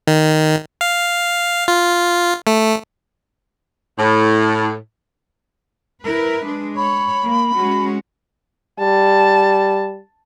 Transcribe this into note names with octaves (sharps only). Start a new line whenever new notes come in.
D#3
F5
F4
A3
A2
E4 A#4 B4
G#3 D4
C#5 B5
A#3
G#3 C#4 F#4
G3 A5